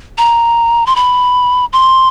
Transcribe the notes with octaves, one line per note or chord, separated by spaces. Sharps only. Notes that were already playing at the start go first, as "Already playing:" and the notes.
A#5
C6
B5
C6